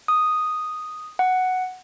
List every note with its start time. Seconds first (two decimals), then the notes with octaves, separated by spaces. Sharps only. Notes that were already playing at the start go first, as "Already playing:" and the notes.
0.08 D#6
1.19 F#5